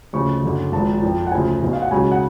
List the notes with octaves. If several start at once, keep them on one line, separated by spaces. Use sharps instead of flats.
D2 C#3 F3 C#6
F#1 F#2 D3 F#3
G#1 G#2 F3 A5
F2 F3
F#5
D2 C#3 F3 G#5
B1 B2 F#3
F5
F#5
C#2 C#3 F#3 G#5
F#5